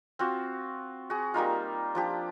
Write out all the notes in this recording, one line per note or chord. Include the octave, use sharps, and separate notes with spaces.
C4 F4 F#4
F#4 G#4
G3 A#3 D#4 F4
F3 D4 G4